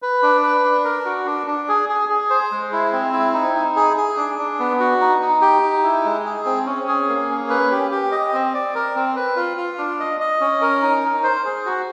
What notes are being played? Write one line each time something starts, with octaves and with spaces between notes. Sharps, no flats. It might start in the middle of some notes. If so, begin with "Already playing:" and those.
B4
D4
B4
D4
A#4
F#4
D4
D4
G#4
G#4
G#4
C5
G#3
E4
C4
E4
D#4
D#4
G#4
G#4
D4
D4
B3
F#4
D#4
D#4
G4
D#4
E4
G#3
G#4
C4
C#4
G#4
A#3
C#4
B4
G4
G4
D#5
C4
D5
A#4
C4
B4
F4
F4
D4
D#5
D#5
C#4
A#4
D#4
D#4
C5
G#4
F#4